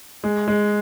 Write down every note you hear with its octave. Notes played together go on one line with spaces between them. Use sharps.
G#3
G#3